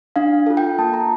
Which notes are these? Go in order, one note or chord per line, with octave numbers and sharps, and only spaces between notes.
D4 F5
F4 A4
G5
A#3 A5
A#5